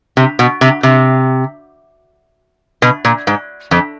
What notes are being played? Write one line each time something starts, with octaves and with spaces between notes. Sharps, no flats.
C3
B2
C3
C3
B2
A#2
G#2
F2